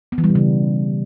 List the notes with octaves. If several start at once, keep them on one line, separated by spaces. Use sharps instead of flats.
B3
E3
G3
B2
C#3